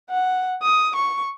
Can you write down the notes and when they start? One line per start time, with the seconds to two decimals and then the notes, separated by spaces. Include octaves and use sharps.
0.10 F#5
0.62 D#6
0.96 C#6